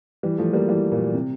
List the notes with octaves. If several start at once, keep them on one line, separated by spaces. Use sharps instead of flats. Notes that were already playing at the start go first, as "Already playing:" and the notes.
E3 G3
F3 A3
G3 A#3
E3 G3
A#2
C3